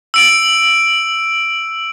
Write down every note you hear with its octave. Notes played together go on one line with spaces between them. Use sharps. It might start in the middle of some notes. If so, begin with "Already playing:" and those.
E6 D7 F#7